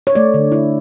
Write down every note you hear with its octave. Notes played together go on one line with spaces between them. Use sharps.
C#5
A3 D5
D3
E4